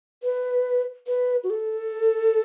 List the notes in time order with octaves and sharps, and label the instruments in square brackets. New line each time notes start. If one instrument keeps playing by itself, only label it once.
[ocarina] B4
B4
F#4
A4